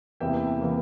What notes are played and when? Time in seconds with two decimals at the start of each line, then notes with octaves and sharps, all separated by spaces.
0.20 E2 C3 E3 G3 A#3 E5 G5
0.61 C3 E3 G3 A#3